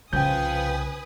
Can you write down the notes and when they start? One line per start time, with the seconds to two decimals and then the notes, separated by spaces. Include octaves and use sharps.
0.13 C2 C#3 F3 B4 G5 G#5 D#6 G6